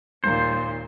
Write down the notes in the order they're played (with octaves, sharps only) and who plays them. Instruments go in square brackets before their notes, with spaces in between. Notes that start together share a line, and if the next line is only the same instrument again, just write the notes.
[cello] D#2 A#2 [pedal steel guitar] C5